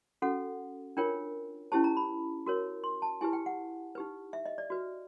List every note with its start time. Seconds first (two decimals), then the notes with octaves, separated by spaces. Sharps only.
0.22 C#4 F#4 A4 F#5
0.97 D4 F4 A#4 C#5 G5
1.72 C#4 E4 G4 C5 A5
1.84 A#5
1.97 B5
2.46 F#4 A#4 C#5
2.84 C6
3.02 A5
3.21 E4 G4 B4 G#5
3.33 G5
3.46 F#5
3.95 D#4 G4 B4
4.33 E5
4.46 D#5
4.58 D5
4.70 F#4 B4